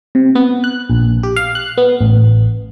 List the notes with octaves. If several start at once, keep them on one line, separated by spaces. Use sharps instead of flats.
C3
B3
F#6
A#1
G4
F5
F#6
B3
A1